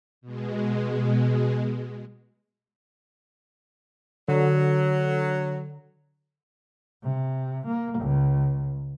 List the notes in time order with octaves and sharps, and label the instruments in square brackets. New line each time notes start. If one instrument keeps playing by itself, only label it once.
[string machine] B2 G#3
[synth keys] D3 [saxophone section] F#3
[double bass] C3
A#3
C#2